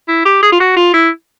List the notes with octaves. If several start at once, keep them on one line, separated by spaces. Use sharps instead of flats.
E4
G4
G#4
F4
F#4
F4
E4